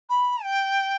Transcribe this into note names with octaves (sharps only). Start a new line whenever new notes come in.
B5
G5